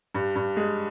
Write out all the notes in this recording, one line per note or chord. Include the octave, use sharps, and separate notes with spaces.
G2
G2
G#3